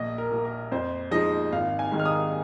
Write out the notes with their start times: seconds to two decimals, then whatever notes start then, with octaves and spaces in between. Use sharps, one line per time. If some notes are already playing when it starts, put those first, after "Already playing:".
Already playing: A#1 D#5
0.18 A#4
0.31 A#2 A#3
0.45 A#4
0.72 F2 C5
1.11 F3 G#3 D#4 D#5
1.52 G#1 F5
1.79 G#5
1.92 G#2 D#3
1.99 F6
2.05 D#6